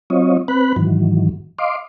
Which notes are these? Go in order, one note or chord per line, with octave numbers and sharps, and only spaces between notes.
F#3 C4 F4 C#5 D#5
C4 B4 B5 F#6
G#2 D#3 E3 F#3
D#5 F5 C6 D6